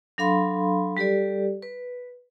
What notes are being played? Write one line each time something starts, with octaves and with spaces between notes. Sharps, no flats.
F#3 D4 A4 F5 B5 C6
G3 G4 A4 D5
B4